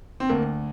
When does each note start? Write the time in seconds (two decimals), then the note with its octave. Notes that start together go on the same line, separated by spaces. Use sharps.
0.20 C4
0.29 D2 A#3